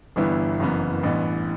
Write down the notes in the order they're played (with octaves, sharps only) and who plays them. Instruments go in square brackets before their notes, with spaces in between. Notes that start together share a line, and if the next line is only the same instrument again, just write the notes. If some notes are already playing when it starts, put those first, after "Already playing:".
[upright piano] G1 G2 E3 B3 E4
F#1 F#2 E3 B3
A1 G2 E3 B3